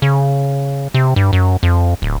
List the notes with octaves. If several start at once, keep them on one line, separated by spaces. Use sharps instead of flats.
C#3
C3
G2
F#2
F2
D1